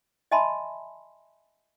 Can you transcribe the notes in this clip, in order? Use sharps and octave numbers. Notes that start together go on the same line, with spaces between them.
D#5 E5 G#5 A5 B5 C6